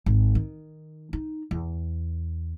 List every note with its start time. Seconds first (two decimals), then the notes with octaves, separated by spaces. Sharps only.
0.06 G#1
0.35 D#3
1.13 D#4
1.51 E2